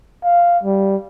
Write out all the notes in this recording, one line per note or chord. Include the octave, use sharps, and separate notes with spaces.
F5
G3